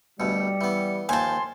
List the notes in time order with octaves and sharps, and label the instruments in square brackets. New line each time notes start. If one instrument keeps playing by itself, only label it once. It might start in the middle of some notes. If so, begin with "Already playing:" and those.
[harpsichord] D2 B2 [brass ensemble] G3 [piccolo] C#7
[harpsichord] E3 B3
[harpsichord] D#2 D#3 F3 [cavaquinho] G#5 A5 [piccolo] C6